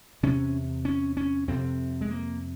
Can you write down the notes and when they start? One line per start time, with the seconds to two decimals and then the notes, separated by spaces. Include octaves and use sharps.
0.23 E2 C3 C#4
0.85 C#4
1.17 C#4
1.48 F2 C3 C4
2.01 G#3
2.11 A#3